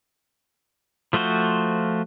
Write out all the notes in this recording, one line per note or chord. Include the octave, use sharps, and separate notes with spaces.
F3 A3 F4 F#4 C5